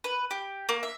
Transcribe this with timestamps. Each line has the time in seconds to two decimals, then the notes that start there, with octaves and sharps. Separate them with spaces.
0.04 B4
0.31 G4
0.69 A#3
0.83 E5